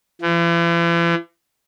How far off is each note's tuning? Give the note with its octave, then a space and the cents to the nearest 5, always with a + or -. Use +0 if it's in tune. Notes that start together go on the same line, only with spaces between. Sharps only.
E3 +45